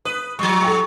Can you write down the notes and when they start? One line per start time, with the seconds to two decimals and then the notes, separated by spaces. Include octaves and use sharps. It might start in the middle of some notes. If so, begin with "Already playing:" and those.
0.05 B4 D#6
0.39 F3 G3 C#6
0.62 A4 G5 C#6